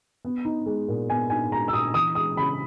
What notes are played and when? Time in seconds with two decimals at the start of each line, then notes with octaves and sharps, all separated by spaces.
0.25 B3
0.45 D#4
0.66 G#3
0.88 A#2
1.10 B3 G#5
1.30 D#4 G#5
1.51 G#3 A#5
1.68 E6
1.73 A#2 D#6
1.94 E3 D#6
2.15 G#3 D#6
2.37 C#3 B5